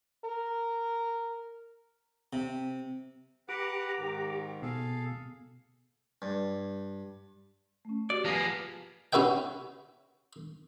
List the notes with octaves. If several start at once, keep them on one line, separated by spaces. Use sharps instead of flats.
A#4
C3
G4 B4 F#5 A#5 D6
G#2 D#3
B2 G#4 A4 F5
G2
A3 C#4
F#4 G4 D5
F3 A#3 B3 G#4 B4
C#4 F#4 B4 E5 G5